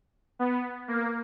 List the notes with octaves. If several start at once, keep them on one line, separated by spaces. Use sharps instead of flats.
B3
A#3